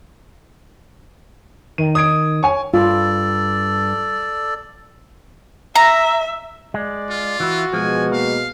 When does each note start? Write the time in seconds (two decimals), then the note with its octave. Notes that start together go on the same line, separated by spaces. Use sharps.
1.78 D#3 D#7
1.95 D#6 G#6 D7
2.43 C#5 G#5 C#6
2.74 G2 F4 A4 D5
5.75 E5 A#5
6.74 G#3 D5
7.10 F4
7.40 E3 E4 F#4
7.73 B2 F3 G#3 G#5
8.12 A#3 F5